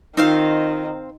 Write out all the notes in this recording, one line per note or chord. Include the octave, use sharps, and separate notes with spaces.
D#3 C4 D#4 F4 C5 F5